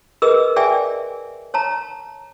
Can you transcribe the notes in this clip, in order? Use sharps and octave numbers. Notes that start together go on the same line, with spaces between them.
G#4 A#4 B4 D#5 E6
G#4 D5 E5 G5 G#5
C#5 A5 A#5